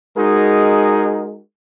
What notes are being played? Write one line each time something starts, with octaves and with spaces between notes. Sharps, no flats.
G#3 D#4 F#4 G#4 A#4